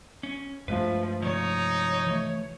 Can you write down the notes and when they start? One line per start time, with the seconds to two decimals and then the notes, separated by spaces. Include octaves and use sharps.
0.23 C#4
0.68 G2 F3 G#3 A3 B4
1.22 C3 F3 D#4 C#5
2.07 E3 A3